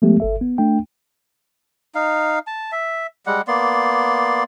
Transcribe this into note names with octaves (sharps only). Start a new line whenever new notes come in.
F3 G#3 A3 B3 G4
G1 A4 E5
B3
A3 D4 G5
D#4 F5
A5
E5
G3 G#3 F#5
A#3 B3 D5 C6